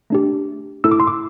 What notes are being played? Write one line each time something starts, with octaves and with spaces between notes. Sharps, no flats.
A3 D4 G4
A3 E4 A4 E6
D6
C6
D6